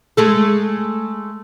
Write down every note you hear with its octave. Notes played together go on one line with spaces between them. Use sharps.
G#3 A3 A4